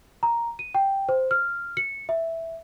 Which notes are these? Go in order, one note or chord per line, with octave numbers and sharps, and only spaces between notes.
A#5
D#7
G5
C5
F6
C#7
E5